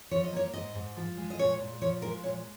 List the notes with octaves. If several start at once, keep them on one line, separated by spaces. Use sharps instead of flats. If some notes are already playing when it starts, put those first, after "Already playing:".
F3 C#5
D#5
A#3 C#5
G#2 D#5
G#2
F3
G#3
D#5
A#2 C#5
A#2
F3 C#5
G#3 A#4
A#2 C#5